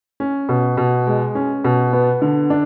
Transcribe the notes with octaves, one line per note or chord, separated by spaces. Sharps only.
C#4
B2
B2
G#3
C#4
B2
B3
D3
D4